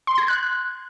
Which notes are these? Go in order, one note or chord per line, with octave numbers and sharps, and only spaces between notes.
C6
G#6
F#6